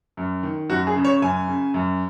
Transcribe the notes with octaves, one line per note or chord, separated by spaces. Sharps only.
F#2
D#3
F#2 F#4
G#4
C#3
C#5
F#2 G#5
C#3
F#2